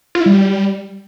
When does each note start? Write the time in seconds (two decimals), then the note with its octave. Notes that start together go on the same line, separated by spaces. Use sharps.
0.15 F4
0.20 E4
0.26 G3